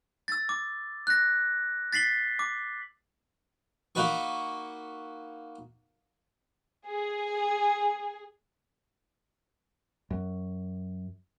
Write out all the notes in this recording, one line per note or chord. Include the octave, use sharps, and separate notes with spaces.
E6 A6
D6
F#6 A#6
A6 B6 C7 F#7 G7
D6
A#3 D#4 F#4 B4 C#6
G#4
F#2